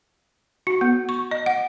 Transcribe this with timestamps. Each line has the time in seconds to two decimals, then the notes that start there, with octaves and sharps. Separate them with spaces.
0.67 F#4
0.81 B3
1.09 C#6
1.31 D#5
1.46 F#5